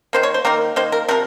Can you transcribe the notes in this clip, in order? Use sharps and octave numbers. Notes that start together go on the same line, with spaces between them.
D#3 A#3 C5
C#5
C5
D#3 A#3 A#4
D#3 A#3 C5
A#4
C3 F3 A#4